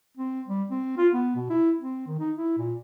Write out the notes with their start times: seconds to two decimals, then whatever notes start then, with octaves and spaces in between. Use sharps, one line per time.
0.17 C4
0.48 G3
0.71 C4
0.98 F4
1.13 B3
1.36 B2
1.50 E4
1.81 C4
2.07 D#3
2.19 D#4
2.36 E4
2.58 A#2